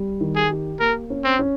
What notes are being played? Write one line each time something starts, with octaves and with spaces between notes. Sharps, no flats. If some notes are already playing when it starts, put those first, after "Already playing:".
Already playing: G3
D#3
G#4
G4
A#3 A#4
C#4
C4
C#4